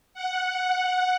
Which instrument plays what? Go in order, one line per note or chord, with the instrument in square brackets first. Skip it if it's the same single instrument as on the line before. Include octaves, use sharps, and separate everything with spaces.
[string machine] F#5